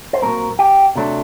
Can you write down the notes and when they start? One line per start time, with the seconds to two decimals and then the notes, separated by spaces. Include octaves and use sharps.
0.13 C5
0.22 A3 C4 A#4
0.26 A#2 F#3
0.59 G4
0.96 C3 F#3 A3 D4